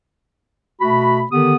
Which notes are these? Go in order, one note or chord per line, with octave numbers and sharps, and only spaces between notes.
B2 A3 F#4 B5
D3 D#3 B3 G4 D#6